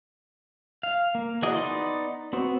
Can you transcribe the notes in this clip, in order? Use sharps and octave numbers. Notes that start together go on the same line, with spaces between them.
F5
A#3
E3 F#4 G#4 D5 D#5
B3 D#4 D5 C6
B3 C4 F#4